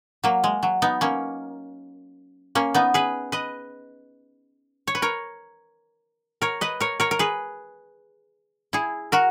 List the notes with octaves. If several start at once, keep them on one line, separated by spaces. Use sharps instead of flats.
F#3 A#3
G#3
F#3
B3 D#4
A#3 C#4
A#3 C#4
B3 D#4
G#4 B4
B4 D#5
C#5
B4
A#4 C#5
A#4 C#5
B4 D#5
A#4 C#5
A#4 C#5
A#4
G#4 B4
E4 G#4
F#4 A#4